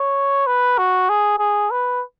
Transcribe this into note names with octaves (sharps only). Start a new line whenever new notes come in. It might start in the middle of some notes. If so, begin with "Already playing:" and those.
Already playing: C#5
B4
F#4
G#4
G#4
B4